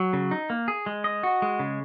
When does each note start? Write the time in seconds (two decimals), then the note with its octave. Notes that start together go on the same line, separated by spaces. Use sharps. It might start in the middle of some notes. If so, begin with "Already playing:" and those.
Already playing: F#3
0.13 C#3
0.31 D#4
0.50 A#3
0.68 G#4
0.86 G#3
1.04 D#5
1.23 F#4
1.42 G#3
1.59 C#3